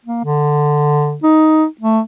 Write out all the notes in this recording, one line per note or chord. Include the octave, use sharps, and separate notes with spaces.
A#3
D3
D#4
A3